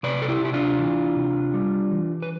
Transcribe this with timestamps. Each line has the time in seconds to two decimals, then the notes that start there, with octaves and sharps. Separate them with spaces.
0.03 C3 B4 D5
0.22 A4
0.28 E4 G4
0.41 C3 E4
0.53 D4 F4
0.79 E3
1.16 C3
1.54 G3
1.91 E3
2.23 B4